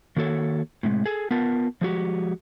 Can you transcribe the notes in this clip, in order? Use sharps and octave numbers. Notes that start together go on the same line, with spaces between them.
D#3 A#3 F#4 A4 C#5
A2 C3 G#3
G#4 A4
B3 F4 A#4 A5
F3 G#3 F#4 G4